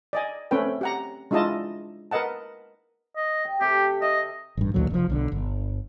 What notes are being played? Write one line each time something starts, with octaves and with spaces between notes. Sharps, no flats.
D5 D#5 G#5
A3 C4 C#4 B4 G5
G4 F#5 A#5
G#3 D4 E4 F4 D#5 A5
A#4 B4 D#5 F#5 A5
D#5
G5
C3 G4 A4
D#5 E5
A1 G2
A1 D2 A#2 F#3
F1 F3
B1 D3
G1